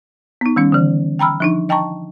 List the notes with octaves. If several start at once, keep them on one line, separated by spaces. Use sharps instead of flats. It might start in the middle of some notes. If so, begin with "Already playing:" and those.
B3 D#4
D#3 G3 C#4
D3 E3
G5 A#5 B5 E6 F6
F3 D4 D#4
D#5 G5 A5 A#5 C#6